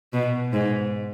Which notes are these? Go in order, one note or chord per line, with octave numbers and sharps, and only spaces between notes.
B2
G#2